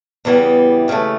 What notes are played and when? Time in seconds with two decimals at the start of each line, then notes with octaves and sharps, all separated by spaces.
0.25 E2 C#3 E3 G3 B3
0.88 D#2 C#3 E3 A3